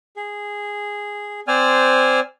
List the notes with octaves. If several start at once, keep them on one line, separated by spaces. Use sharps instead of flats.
G#4
C4 C5 D5 G#5 F6